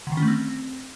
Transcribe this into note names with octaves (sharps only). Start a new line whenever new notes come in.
D3
D#3
C#4
A3
C4